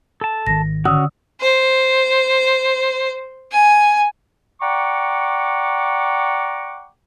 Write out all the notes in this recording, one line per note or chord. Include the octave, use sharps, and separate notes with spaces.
A4 A5
G#1 D#3 A#6
D3 C#4 F#4 D#6 E6
C5
G#5
D5 F#5 G5 A#5 C#6 D6